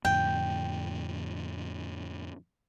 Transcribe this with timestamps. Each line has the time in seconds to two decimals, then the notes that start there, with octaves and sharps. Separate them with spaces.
0.05 F2 A2 D3 G5